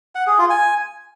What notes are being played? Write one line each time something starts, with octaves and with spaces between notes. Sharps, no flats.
F#5
G#4
F4
G#5